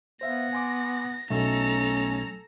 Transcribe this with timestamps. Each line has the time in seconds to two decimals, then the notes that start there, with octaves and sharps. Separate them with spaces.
0.21 B3 C5 E5 F5 A#6
0.53 G#5 C6 D6
1.30 B1 A3 C#4 A4 A#5